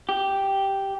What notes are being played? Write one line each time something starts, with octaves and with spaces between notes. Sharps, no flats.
G4